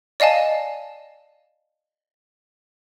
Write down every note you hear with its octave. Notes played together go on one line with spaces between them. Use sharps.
D5 D#5 F5 G#5 A5